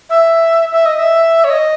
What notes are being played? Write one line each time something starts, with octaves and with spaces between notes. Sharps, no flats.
E5
E5
D#5
E5
C#5
D#5